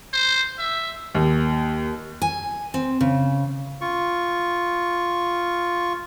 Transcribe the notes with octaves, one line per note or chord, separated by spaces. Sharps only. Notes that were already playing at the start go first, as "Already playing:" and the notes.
C5
E5
D#2
G#5
C4
C#3
F4 C#6